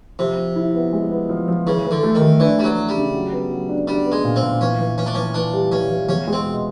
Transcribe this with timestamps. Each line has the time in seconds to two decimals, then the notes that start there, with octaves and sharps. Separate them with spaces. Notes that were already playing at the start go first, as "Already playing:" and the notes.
0.19 C3 F3
0.38 F3
0.56 E4
0.75 B3
0.93 G#3
1.11 B3
1.29 F3
1.48 F3
1.66 C#3 E3
1.85 E3
1.91 D3
2.03 A3
2.15 D#3
2.22 A3
2.40 E3 D4
2.58 G3 D4
2.64 F#3
2.76 A3
2.89 G3
2.95 C#3
3.14 F#3
3.32 B3
3.51 F#3
3.69 D4
3.87 G3 D4
4.06 B3
4.12 G#3
4.24 A#2
4.36 C4
4.43 A#2
4.61 E3 C#4
4.79 E3
4.98 E3 C#4
5.06 D4
5.15 E3 C#4
5.34 E3 D4
5.54 G3
5.71 E3 C#4
5.90 E3
6.09 E2 C#4
6.27 G#3
6.33 C4
6.45 B2